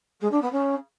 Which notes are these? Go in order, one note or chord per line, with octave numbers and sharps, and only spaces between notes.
G#3
D4
B3
C#4